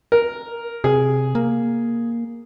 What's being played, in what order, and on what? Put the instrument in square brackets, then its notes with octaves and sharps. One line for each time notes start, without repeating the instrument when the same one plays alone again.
[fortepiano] A#4
[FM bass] C3 [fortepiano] G#4
[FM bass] A#3